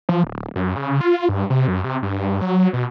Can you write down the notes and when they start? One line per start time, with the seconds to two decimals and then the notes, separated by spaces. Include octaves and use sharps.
0.09 F3
0.24 D1
0.56 F#2
0.76 C#3
1.01 F4
1.29 G2
1.50 C3
1.68 F#2
1.84 C3
2.03 G2
2.41 F#3
2.73 B2